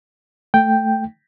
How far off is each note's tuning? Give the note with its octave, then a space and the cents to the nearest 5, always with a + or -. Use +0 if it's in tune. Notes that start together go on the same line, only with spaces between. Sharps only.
A3 +0 G5 +0